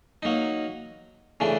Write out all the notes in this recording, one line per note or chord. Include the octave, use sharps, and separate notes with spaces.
F#3 A#3 D#4
C#3 E3 A3 D4